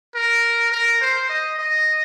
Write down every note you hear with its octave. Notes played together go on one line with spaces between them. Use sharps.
A#4
A#4
C5
D#5
D#5